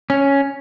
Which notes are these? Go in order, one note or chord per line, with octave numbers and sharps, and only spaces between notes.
C#4